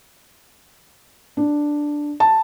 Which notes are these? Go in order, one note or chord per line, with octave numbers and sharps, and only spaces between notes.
D4
A5